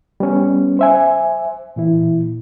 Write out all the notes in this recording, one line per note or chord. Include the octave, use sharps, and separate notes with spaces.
G3 B3 C#4
C5 E5 G#5
A#2 E3 E4